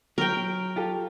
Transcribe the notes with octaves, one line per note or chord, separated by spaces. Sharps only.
F#3 A#4 G5
F4 G4 A4